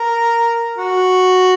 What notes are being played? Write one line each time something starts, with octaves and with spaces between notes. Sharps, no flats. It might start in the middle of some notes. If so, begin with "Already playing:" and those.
Already playing: A#4
F#4